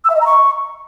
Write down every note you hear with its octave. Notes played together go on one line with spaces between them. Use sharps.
E6
E5
D#5
A#5
C#6